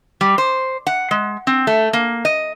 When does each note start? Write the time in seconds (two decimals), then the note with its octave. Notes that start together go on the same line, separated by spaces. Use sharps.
0.21 G3
0.38 C5
0.87 F#5
1.11 G#3
1.47 C4
1.67 A3
1.93 A#3
2.25 D#5